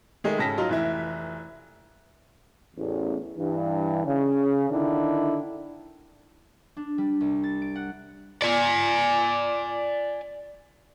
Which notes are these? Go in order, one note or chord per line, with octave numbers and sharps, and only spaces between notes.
D#3 G#3 A3
G#1 C#3 A5 A#6 B6
F#3 D#4 F4
F1 E3 E4
A1 E2
G2 E3
C#3
D3 D#3 D4 E4
D4
G3
C2
A6
D7
F#5
D5 G#5